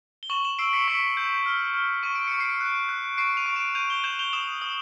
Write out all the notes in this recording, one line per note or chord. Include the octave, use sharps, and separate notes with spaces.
G7
C#6 E7 F#7
E7 F#7
E6 C7 D7
B6 C#7
C#6 B6 C#7
G6
F6
F6
C#6 D#7
D7
C#6 C#7
C7 D7
F#6
F#6
C#6 C7 D7
D#7 F7
C#6
D7 E7
G6 D#7 F7
F7 G7
G6 E7 F#7
F7 G7
D#6 E7 F#7
D#6